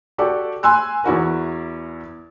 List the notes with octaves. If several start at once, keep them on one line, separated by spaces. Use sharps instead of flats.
F#4 G4 A4 D5
G#5 C6 E6 F#6
E2 E4 F#4 A#4